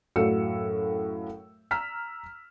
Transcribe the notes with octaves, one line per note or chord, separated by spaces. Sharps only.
F#2 A2 F#3 F5 E6 C#7
A#5 E6 F6 B6